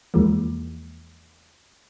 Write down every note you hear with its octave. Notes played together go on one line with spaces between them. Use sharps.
E2 E3 F3 G#3 A#3